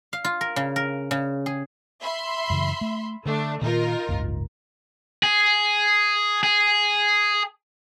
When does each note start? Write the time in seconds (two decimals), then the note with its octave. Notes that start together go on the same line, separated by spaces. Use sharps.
0.13 F5
0.25 F4
0.41 A#4
0.56 C#3
0.76 A#4
1.11 C#3
1.46 G#4
2.02 E5 B5 C6
2.50 F#2 C#3 E3
2.81 A3
3.26 D3 A3 D4
3.62 A#2 D#3 D#4 F4 A#4
4.09 F#1 C#2 G#2
5.23 G#4
6.43 G#4